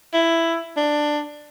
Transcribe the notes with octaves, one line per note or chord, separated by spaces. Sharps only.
E4
D4